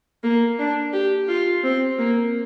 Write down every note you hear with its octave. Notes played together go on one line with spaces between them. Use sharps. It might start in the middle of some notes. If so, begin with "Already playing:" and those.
A#3
D4
G4
F4
C4
A#3